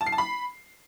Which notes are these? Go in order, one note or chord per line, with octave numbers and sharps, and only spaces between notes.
A5
C7
A5
B5